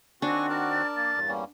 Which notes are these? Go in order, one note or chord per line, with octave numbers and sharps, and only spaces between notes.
D#2 C4 D4 F#4 F#5 G#5 C#6
A#4 D5 A5
A6
A#3 A6
E2 G2
G3 A#3 C#4